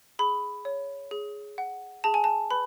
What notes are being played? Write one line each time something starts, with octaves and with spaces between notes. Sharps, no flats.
G#4 B5
C#5
G#4
F#5
G#4 A5
G#5
A5
B4 B5